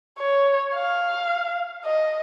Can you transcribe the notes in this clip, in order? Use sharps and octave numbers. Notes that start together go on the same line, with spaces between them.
C#5
F5
D#5